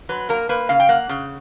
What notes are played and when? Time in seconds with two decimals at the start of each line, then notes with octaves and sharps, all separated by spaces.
0.09 F#3 B4
0.29 A#3 A#4
0.49 A#3 B4
0.69 C#3 F5
0.80 G5
0.89 A#3 F#5
1.09 C#3